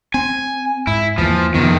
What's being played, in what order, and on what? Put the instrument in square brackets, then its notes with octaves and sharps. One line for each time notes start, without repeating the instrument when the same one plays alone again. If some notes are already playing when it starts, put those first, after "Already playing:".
[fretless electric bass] C4 [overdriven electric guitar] G#5
[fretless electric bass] G#2 [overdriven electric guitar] E4
[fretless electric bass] E2 E3 A#3 [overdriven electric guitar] F3
[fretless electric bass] F2 F3 B3 [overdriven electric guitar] C3 D#3